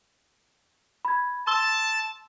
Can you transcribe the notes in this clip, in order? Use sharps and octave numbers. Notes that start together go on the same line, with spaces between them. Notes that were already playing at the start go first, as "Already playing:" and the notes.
B5 G#6
A5 C6 E6 G7